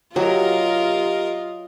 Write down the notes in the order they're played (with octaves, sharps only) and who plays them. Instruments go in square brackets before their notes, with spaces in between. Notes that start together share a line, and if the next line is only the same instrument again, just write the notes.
[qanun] F#3 [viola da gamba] F4 [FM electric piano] G4 [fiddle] A#4 D#5